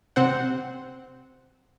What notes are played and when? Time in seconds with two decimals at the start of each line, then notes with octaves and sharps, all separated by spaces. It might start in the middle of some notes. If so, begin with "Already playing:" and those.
0.16 C3 C4 C5 F#5